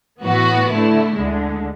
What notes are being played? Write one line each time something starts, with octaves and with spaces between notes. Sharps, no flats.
A2 E3 B3 F#4 B4
D3 A3 E4
D2 D3 G#3